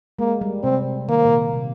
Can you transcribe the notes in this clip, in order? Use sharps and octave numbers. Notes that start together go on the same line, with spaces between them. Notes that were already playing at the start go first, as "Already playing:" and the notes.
G#3 A#3
G3
C3 C4
D#3 A#3
A#2
C3
C3